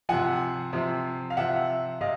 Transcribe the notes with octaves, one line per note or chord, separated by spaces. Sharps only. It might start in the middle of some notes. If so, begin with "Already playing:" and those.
C3 F3 F#5 G#5
C3 F3
F5
C3 F3 E5 F#5
C3 D#5 F5